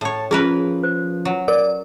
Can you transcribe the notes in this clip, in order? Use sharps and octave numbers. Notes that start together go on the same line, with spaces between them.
A2 C#5 A5
F3 C#4 G#4 A#4 B4
C5
F#3
A#4 D5